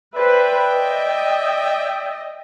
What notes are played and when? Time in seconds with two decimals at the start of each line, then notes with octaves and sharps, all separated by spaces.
0.16 B4 C5 D5 E5 G5
0.70 D#5